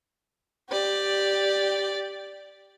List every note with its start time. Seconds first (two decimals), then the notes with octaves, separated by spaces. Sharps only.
0.70 G4 D5